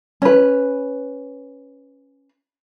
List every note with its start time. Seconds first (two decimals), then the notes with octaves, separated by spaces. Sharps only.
0.22 C#4 B4